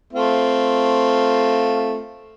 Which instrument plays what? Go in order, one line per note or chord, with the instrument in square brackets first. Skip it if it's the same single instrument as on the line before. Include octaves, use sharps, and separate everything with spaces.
[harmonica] A3 C4 F4